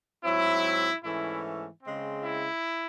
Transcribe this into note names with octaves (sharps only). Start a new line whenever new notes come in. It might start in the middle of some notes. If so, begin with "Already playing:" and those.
G#2 F#3 C4 E4
G#2 E3 A3 C#4 E4
C#3 G#3 C4
E4